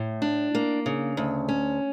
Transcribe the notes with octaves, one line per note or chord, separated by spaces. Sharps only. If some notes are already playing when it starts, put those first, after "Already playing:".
Already playing: A2
D4
A#3
C#3
D2
C#4